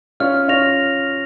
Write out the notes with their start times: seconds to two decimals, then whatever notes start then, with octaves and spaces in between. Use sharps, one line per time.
0.20 C#4 F4 F6
0.48 C#4 F4 A#6 F7